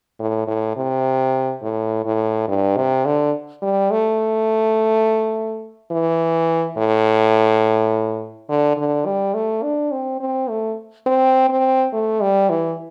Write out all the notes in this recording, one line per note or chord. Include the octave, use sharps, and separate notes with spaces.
A2
A2
C3
A2
A2
G2
C3
D3
G3
A3
E3
A2
D3
D3
G3
A3
D4
C4
C4
A3
C4
C4
A3
G3
E3